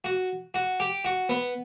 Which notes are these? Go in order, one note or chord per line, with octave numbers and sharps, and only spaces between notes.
F#4
F#4
G4
F#4
B3